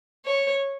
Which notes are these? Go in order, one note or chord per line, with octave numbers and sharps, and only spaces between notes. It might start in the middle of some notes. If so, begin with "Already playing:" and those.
C#5